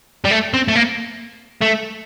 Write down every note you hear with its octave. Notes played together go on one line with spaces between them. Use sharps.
G3
A3
C4
A3
A#3
A3